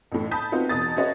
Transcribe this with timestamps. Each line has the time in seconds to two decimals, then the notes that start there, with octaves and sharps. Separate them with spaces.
0.12 A1 A2
0.31 A5 B5 D#6 G6 B6
0.52 B3 C4 D#4 F4 F#4
0.69 E2 B2 D#6 A6
0.96 C#4 F#4 G#4 B4 C#5 D#5